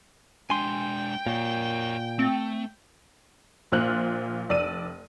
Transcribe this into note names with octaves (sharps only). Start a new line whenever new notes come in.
G#3 D4 G5 G#5 C6
A#2 A#4 C#5
A3 C4
A#1 A#2 F4 C5 F6 F#6
F1 D5 E6 D#7